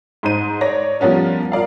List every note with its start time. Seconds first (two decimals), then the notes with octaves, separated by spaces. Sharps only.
0.23 G#2 D#4 C5 D#7
0.61 C#5 D5 A#6
1.00 F3 G3 B3 C#4 A#4
1.52 F4 A#4 D5 F5